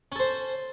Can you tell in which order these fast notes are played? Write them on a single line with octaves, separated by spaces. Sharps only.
C#4 A4 C5